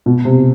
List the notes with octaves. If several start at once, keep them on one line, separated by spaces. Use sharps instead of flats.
B2
C3